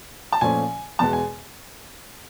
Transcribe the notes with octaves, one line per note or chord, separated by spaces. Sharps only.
A5
A#2 F3 A3 C#4 G#5
E2 B2 G#3 B3 A5
G#5